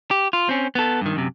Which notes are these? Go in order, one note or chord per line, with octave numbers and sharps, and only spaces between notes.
G4
F4
C4 C#4
B3 A4
G2 D#3
F#2 C3